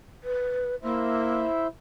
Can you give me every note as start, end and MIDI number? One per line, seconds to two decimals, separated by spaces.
0.24 0.75 71
0.83 1.44 58
0.83 1.67 64
0.83 1.67 72
0.83 1.67 76